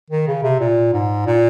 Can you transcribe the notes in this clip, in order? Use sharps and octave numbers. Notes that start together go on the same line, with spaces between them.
D#3
C#3
C3
A#2
G#2
A#2